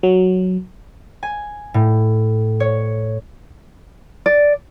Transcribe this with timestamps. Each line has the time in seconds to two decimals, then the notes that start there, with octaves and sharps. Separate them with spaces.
0.03 F#3
1.23 G#5
1.74 A2
2.60 C#5
4.26 D5